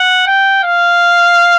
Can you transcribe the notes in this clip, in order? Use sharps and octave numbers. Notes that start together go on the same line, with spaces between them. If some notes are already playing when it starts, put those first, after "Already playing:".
Already playing: F#5
G5
F5